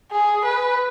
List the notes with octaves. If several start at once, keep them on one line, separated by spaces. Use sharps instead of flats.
G#4
B4